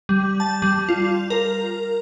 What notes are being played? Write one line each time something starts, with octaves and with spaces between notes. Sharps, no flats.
G3
A5
G3
F4
A#4